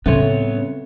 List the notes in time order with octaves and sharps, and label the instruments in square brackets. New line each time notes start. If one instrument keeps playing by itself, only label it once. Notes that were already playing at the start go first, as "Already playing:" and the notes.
[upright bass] A2 G3 [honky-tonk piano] C#3 [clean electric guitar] B3 C#5 [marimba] C4 A4 E5